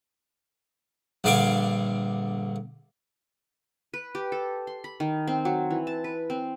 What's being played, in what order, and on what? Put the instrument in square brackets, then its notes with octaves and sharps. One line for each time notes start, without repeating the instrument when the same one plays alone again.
[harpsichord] A#1 G2 D3 F5 G#5 D6
[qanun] B4
G4
A4
C6
B5
D#3
C4
F#3
E3
A5
B4
C4